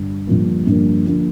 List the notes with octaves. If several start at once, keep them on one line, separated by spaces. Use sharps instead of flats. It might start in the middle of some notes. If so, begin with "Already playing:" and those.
Already playing: G2 D3
G2 D3 F3 A#3
G2 D3 F3 A#3
D3 F3 A#3